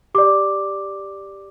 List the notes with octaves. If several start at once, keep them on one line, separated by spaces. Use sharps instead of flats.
G4 D5 D6